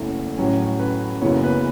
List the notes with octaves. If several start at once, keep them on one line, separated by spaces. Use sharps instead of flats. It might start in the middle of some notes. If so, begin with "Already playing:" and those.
Already playing: F#1 E2 E3 A3 C#4 E5
A1 A2 F#3 C#4
B4
F#1 F#2 C#3 E3 B3 C#5
B4